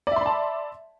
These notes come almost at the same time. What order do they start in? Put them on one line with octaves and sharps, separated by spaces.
D5 E5 C6 B5 A5